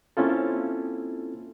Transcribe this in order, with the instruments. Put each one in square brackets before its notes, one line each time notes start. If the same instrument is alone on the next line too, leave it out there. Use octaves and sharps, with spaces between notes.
[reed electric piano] A#3 C4 C#4 E4 F4 A4